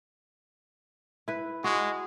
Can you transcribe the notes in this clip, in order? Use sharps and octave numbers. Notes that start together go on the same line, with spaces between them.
E4 B4
G#3 F#4